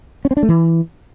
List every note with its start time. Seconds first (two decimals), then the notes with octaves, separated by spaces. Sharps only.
0.25 C#4
0.31 C4
0.37 D4
0.43 A3
0.49 E3